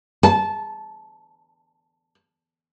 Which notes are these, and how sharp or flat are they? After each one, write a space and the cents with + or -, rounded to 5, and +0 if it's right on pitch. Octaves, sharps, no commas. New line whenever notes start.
A5 -20